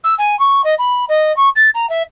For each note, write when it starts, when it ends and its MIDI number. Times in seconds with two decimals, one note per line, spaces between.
0.04 0.14 88
0.18 0.38 80
0.39 0.61 85
0.64 0.74 75
0.78 1.05 83
1.08 1.34 75
1.36 1.49 85
1.55 1.70 93
1.74 1.88 82
1.89 2.02 76